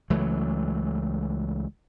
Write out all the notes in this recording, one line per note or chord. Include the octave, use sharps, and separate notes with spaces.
C#2 E3 F#3 A3